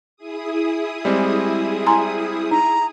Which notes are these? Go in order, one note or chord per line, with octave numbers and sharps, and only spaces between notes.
E4 G#4 D#6
G3 G#3 C4
G#5 A#5 C6
D#4 A#5